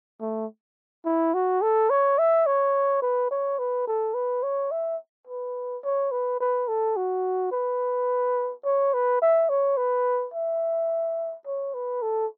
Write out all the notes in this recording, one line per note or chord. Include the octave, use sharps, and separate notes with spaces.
A3
E4
F#4
A4
C#5
E5
C#5
B4
C#5
B4
A4
B4
C#5
E5
B4
C#5
B4
B4
A4
F#4
B4
C#5
B4
E5
C#5
B4
E5
C#5
B4
A4